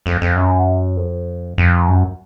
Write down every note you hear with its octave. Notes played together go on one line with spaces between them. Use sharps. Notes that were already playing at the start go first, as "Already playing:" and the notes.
F2
F2
F#2
F2
F2
F#2